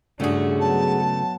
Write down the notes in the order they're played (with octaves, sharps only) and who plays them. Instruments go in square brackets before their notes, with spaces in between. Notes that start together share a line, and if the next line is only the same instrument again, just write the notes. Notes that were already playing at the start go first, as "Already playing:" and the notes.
[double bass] G2 D4 [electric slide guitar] C#3 A3 F#4 [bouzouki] C#4 G#4
[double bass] F#3 B3 [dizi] A5